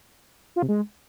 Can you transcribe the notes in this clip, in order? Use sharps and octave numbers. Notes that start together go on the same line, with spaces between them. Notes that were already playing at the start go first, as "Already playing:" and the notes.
F4
C3
G#3